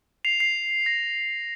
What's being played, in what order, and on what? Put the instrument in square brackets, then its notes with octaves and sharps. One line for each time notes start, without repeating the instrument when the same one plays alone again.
[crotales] C7 F7
C7
A#6